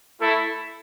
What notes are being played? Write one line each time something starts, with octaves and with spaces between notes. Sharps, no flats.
A3 E4 A4